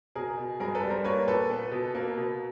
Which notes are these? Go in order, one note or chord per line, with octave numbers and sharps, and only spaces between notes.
B2 G#4 A#4
B2
G2 G#4 A#4
A4 B4
G3
A#4 C5
A#3 B4 C#5
A#2 A4 B4
B3
B2
A#3
B2